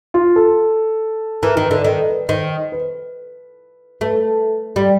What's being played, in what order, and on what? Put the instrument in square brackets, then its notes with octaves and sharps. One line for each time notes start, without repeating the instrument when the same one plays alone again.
[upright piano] F4
A4
[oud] E3 [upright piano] A#4
[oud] D#3
[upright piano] B4
[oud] D3
[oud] D#3 [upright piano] A#4
[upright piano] B4
[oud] D#3 [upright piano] C5
[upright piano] B4
[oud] A3 [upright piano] B4
[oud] G3